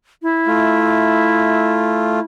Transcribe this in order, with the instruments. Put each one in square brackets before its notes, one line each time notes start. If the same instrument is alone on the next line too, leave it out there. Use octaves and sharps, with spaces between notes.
[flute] E4
[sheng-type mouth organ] A3 F4